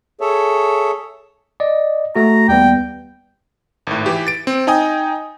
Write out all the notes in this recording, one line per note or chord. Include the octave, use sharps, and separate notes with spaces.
G#4 A4 C#5 E5
D5 D#5
A3 F#4 A#5
D#2 G3 B3 G5
G#1 A2
E3 G4
A6 D7
C4
D#4 D#5 G5 G#5 D#6